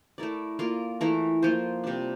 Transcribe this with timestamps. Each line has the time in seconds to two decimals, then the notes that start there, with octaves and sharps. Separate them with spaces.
0.18 A3 E4 A#4 D5
0.59 A#3 F4 A#4 D5
1.01 E3 A3 E4 A#4
1.42 F3 A#3 F4 C5
1.84 C3 G3 D4